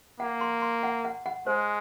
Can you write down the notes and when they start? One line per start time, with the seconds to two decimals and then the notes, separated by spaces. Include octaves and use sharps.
0.20 A#3 F#5
0.41 C6
0.62 C6
0.83 F#5
1.05 F#5
1.26 F#5
1.47 G#3 C5